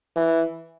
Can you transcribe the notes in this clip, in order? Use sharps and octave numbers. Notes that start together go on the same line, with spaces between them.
E3